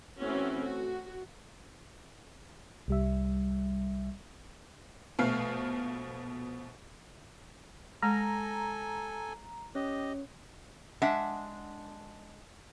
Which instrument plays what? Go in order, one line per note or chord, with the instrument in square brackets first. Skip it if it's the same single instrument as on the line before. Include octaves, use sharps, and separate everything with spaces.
[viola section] E3 A3 C4 C#4 F#4
F#4
[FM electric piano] C2 G3 E5
[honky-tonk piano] A#1 B2 A3 F5 F6
[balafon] G#3 [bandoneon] A4 G#5 [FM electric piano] A#5
[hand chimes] C#4 C#5 [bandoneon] G4 D#5
[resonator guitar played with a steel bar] G#3 D4 E5 F#5